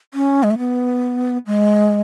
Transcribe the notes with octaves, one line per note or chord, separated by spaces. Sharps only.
C#4
G#3
A3
B3
G#3